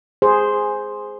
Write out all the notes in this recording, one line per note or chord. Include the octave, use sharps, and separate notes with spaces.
G#4 C5